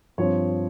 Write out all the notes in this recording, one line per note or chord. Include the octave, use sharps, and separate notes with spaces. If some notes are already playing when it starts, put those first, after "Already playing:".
G2 F3 C4 C#5